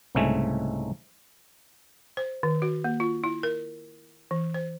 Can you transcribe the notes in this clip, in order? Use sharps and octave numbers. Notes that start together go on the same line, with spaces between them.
C2 G#2 C#3 G#3 A3 G#5
C5
D#3
F#4
A#3
F4
E4
A#4
E3
C5